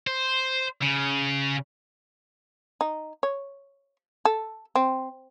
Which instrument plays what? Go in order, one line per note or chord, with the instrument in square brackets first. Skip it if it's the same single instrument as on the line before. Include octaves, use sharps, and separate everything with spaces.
[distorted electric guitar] C5
C#3
[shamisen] D#4
C#5
A4
C4